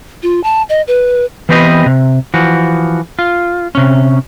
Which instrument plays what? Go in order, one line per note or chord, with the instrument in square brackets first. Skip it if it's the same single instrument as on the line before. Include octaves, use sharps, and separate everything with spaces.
[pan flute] F4
A5
D#5
B4
[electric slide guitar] E3 B3 C4 G4 B4 D#5
C3
E3 F3 F#4
F4
C3 C#4